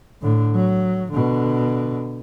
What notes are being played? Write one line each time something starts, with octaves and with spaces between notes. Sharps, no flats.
A2 D3
F#3
B2 D3